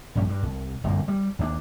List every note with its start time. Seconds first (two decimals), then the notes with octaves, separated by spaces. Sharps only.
0.15 A#1 G2 C#4
0.29 G2
0.43 C2
0.84 G1 C2 F#2 A#2
1.08 G3
1.39 D#2 F3 D4